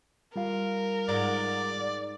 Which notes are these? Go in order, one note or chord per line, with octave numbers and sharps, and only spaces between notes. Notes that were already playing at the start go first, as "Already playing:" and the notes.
G3 F4 A#4 F5
G#2 D5